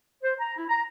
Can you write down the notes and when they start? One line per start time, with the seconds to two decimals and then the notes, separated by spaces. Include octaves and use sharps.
0.23 C5
0.40 A#5
0.57 E4
0.69 A#5